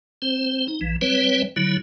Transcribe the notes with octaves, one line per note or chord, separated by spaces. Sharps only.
C4 C5
D#4
A#1 E3
G3 C4 B4 C#5
D3 F#3 E4